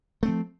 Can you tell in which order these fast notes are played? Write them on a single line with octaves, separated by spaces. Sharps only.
A3 C4 F3